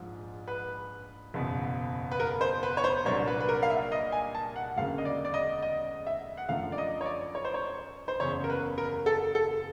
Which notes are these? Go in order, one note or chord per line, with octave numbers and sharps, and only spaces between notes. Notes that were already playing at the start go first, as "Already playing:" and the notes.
Already playing: A#1 G#2 F3
B4
F#1 E2 B2
B4
A#4
C5
B4
C#5
C5
C2 A#2 F#3 A#3 D4 C#5
B4
B4
A#4
F5
E5
D#5
G#5
A5
F#5
E1 D2 C#3 F#3 A#3 F5
D#5
D5
D5
D#5
D#5
E5
F#5
F#2 D3 F3 A3 F5
D5
D#5
C#5
D5
C#5
C5
C#5
C5
F#1 E2 C#3 C#5
A#4
B4
A#4
A4
A4